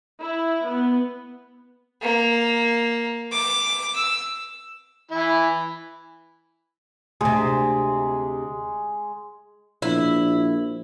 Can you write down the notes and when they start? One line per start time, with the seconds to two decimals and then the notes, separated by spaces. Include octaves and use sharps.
0.20 E4
0.67 B3
2.02 A#3
3.32 D6
3.96 E6
5.11 E3 E4
7.21 D2 C3 G#3
9.82 A#1 E4